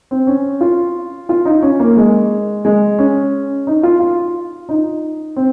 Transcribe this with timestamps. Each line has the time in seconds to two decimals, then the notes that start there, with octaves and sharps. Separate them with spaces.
0.11 C4
0.27 C#4
0.61 F4
1.29 F4
1.45 D#4
1.62 C#4
1.80 A#3
1.97 G#3
2.65 G#3
2.99 C#4
3.67 D#4
3.83 F4
4.00 F4
4.69 D#4
5.36 C4